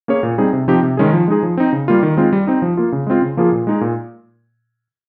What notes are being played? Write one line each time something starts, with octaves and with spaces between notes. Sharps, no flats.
A#3 C#4 G#4 C#5
A#2
G3 C4 D#4 G#4
C3
F3 C4 D#4 G4
C3
D#3 G#3 C#4 G#4
F3
G#3 D#4 G#4
F3
C4 D#4
C#3
G3 A#3 F4
D#3
G#3 C4 F4
G3
C4 D#4
F3
A#3 F4
C#3
G#3 C4 F4
C#3
F3 A#3 F4 G#4
A#2
G#3 D#4 G#4
A#2